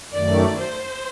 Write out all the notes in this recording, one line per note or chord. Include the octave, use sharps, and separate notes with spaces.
F#2 D#3 A3 D5
C5